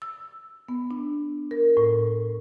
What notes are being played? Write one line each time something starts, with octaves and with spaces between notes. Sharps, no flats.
E6
B3
D4
A#4
A2